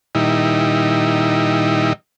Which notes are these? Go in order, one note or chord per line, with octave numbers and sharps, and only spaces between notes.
A#2 D#3 G3 D#4 E4